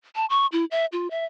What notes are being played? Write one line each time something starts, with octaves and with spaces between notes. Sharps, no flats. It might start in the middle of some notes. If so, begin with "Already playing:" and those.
A5
C#6
E4
E5
F4
E5